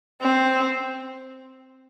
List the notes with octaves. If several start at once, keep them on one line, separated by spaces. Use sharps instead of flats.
C4